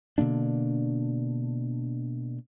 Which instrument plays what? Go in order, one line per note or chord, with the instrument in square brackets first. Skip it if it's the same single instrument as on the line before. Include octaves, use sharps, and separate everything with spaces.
[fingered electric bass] B2 D3 A#3 D4